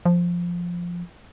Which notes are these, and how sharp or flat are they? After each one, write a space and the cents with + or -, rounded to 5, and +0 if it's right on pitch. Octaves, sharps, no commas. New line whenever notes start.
F3 +0